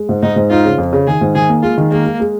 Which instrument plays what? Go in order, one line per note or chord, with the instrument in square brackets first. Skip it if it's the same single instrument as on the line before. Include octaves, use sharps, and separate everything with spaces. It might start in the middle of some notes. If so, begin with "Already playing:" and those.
Already playing: [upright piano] G#3
G#2
[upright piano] G#2 [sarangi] D#4
[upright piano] G#2
[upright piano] D#4 [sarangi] F4
[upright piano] C#3
F2
C#3
[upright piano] D#3 [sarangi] G#4
[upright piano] G#2
[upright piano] D#3 [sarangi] G#4
[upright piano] A#3
[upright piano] G#3 [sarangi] F4
[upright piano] D#3
[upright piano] G#3 [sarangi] A#3
[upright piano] G#3
G#3